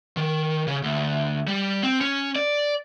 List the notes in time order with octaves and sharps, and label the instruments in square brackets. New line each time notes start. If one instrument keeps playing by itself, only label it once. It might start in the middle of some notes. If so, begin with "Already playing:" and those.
[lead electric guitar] D#3
C#3
D2
G3
C4
C#4
D5